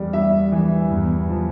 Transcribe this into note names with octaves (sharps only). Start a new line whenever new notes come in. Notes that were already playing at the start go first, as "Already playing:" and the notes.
Already playing: E2 G3
G3 E5
E3
E2
F3